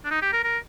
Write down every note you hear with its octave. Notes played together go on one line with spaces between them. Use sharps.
D4
D#4
G4
A#4
A#4